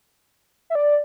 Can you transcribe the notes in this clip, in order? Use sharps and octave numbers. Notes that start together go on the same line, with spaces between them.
E5
D5